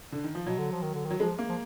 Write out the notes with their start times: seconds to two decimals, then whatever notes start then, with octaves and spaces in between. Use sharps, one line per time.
0.12 D3
0.24 D#3
0.35 F3
0.47 B2 F#3
0.58 D3
0.72 F3
0.82 D#3
0.94 D3
1.06 D#3
1.11 F#3
1.20 F3 G#3
1.39 A#3
1.49 F3